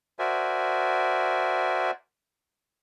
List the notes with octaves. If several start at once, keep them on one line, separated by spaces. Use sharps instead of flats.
F#4 A#4 C5 D5 E5 G#5